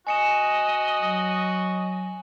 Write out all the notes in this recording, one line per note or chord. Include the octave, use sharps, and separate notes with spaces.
F#4 D#5 G#5 C#7 E7
F#3